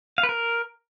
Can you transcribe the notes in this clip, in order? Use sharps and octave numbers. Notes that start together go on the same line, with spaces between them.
F5
B4
A#4